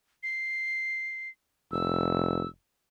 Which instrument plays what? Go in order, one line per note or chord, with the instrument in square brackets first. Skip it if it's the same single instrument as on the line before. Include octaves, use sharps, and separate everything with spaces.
[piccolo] C7
[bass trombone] F1 [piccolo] E6